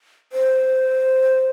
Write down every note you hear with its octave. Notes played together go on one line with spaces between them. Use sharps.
C5